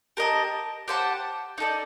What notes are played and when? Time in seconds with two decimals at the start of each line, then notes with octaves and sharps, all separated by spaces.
0.17 G4 A#4 D#5 A5
0.88 G4 C5 F#5 A5
1.58 D#4 A4 D5